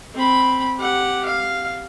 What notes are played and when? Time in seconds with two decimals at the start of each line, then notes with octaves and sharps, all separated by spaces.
0.15 C4 B5
0.77 G4 F#5
1.25 F5